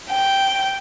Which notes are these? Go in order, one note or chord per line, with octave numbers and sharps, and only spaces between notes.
G5